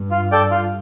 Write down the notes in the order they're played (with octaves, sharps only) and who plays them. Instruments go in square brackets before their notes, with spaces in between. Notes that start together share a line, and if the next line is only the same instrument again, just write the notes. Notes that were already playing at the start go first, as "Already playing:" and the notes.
Already playing: [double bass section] G2
[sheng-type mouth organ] F4
A4 D5 G5
F4